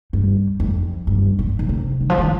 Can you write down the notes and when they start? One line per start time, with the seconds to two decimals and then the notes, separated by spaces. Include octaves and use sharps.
0.13 G2
0.60 F2
1.07 G2
1.39 A#2
1.59 A#2
1.69 C3
2.01 D#3
2.10 F3
2.18 D#3